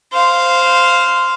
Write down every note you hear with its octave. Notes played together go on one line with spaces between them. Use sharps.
C5 F5